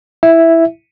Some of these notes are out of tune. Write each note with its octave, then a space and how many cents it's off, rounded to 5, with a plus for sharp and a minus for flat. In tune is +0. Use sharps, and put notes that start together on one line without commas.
E4 +0 E5 +0